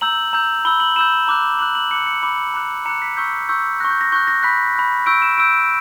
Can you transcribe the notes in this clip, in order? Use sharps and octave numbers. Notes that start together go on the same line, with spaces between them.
A#5 E6 G6 F#7
A#5 E6 G6
B5 E6 G6 G7
F#7
B5 E6 G6 E7
A#5 D6 F#6
A#5 D6 F#6 F#7
F#7
B5 D6 F#6 C#7
C#7
B5 D6 F#6
A#5 D6 F#6
A#5 D6 F#6 C#7
B6
C#6 E6 G6 B6
C#6 E6 G6
C#6 F#6 A#6
G6
A#6
C#6 F#6 G6
A#6
B5 F#6 B6
B5 F#6
C#6 E6 G6 D7
E7
C#6 E6 G6 D7